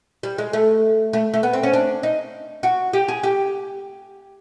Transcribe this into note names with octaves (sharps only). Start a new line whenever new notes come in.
G3
G#3
A3
A3
A3
B3
C4
C#4
D4
D#4
F#4
G4
G#4
G4